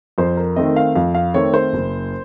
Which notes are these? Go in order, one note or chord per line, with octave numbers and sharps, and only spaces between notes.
F2 C5
A#4
D#3 A3 C4 D#5
F5
F2 F5
F5
D#3 A3 C4 C#5
C5
F#1